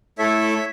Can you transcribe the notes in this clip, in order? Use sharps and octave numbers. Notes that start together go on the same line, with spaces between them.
A3 E4 A4 C#5 E5